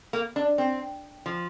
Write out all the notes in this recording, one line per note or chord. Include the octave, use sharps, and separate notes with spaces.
A#3
D4
C4
F3